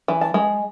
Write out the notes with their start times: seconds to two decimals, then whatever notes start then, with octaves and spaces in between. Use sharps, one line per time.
0.08 E3
0.21 A5
0.34 G#3